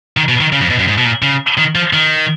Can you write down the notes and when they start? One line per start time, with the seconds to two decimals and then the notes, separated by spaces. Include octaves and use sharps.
0.17 D#3
0.29 B2
0.41 D#3
0.52 C#3
0.61 F2
0.70 B2
0.79 F#2
0.88 G#2
0.98 B2
1.05 A#2
1.22 C#3
1.58 D#3
1.75 F3
1.93 D#3